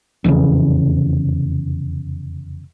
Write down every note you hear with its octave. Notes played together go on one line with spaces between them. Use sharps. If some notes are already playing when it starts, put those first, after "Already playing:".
F1 E2 G#2 C#3